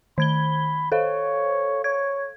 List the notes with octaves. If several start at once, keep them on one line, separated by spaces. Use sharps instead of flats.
D#3 B5 G#6 G7
A4 C5 C#5 F5
C#5 G#6